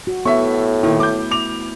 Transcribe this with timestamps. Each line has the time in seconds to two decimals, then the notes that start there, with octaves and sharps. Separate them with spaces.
0.07 F#4
0.25 A2 B3 E5 C#6
0.83 A#2 D#3 E4
1.00 A3 D6 G6
1.31 D6 F7